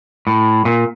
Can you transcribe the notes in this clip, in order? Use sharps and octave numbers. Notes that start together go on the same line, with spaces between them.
A2
A#2